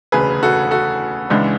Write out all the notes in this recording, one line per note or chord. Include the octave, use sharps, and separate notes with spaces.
E1 D2 C#3 G#4 B4
F#4 A4
F#4 A4
C#2 C#3 E3 G#3 D4